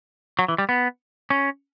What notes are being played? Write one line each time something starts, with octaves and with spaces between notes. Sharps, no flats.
F#3
E3
G3
B3
C#4